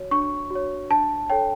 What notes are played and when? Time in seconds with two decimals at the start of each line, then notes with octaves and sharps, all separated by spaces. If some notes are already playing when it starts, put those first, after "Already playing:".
Already playing: F#4 C#5
0.11 D4 C#6
0.51 F#4 C#5
0.90 D4 A5
1.30 A4 C#5 G5